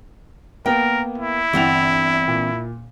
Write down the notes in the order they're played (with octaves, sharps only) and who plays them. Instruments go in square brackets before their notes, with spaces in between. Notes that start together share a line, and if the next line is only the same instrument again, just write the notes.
[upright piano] A#3 B3 [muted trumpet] A#4 [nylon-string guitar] G5
[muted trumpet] E4
[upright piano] G1 F#5 F7 [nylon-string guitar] E3 C4 D4
[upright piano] A#2